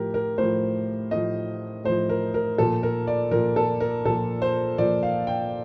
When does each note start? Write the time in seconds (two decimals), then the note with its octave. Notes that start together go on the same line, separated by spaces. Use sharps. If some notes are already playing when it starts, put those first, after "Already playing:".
Already playing: A2 F3 G4 A#4
0.14 A#4
0.38 A2 F3 C5
1.11 A2 F3 D#5
1.84 A2 F3 C5
2.09 A#4
2.34 A#4
2.58 A#2 F3 A4
2.83 A#4
3.07 D5
3.31 A#2 F3 A#4
3.56 A4
3.80 A#4
4.05 A#2 F3 A4
4.42 C5
4.78 A#2 F3 D5
5.03 F5
5.27 G5